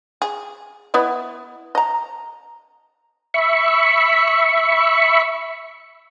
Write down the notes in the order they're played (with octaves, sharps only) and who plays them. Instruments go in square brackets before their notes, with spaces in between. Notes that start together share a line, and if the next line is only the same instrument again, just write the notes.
[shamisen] G#4
B3 E4 D#5
D#5 A#5
[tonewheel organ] E5 B5 C#6